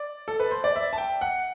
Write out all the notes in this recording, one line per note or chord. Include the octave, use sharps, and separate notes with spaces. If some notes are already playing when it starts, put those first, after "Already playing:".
Already playing: D5
A4
B4
C5
D5
E5
A5
G5
F#5